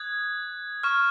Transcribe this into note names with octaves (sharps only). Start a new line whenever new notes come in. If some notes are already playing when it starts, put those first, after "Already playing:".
Already playing: D#6 F#6 G#6
C#6 F6